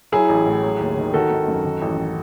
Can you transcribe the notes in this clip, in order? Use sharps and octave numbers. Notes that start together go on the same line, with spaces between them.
F#3 E4 G#4
A1
A2
F#3
D#2
D#3
D#3 F#4 A4
G#1
F#2
D#3
A1